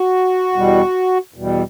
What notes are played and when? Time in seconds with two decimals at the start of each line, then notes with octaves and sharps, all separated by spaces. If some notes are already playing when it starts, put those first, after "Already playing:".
Already playing: F#4
0.53 E2 B2 G3
1.34 E2 B2 G3